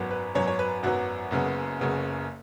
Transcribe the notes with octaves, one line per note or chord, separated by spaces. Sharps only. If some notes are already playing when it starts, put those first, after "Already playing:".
Already playing: G#1 F#2 F#3 B3
B4
G#1 F#2 F#3 B3 C#5
C#5
B4
G#1 F#2 F#3 B3 F#4
F#1 F#2 C#3 B3
F#1 F#2 C#3 B3